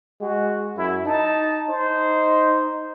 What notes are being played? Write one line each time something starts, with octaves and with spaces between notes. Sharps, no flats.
G#3 F#4
F#2 E4
D#4 A5
D#4 C5